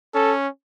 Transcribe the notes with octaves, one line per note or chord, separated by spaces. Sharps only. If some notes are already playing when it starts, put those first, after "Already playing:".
C#4 A4